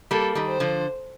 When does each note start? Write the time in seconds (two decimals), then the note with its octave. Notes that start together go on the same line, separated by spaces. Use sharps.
0.11 G3 A#3 A4
0.35 D#3 G3
0.48 C5
0.60 D3 F3